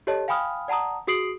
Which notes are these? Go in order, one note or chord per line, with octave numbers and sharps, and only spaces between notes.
G4 A4 C#5 D#5 A5
F5 G5 G#5 B5 D#6 F6
D5 F#5 A5 A#5 D#6
F#4 G#4 D#6 C7 D7 F#7